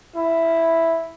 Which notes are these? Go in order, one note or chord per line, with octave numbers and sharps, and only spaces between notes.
E4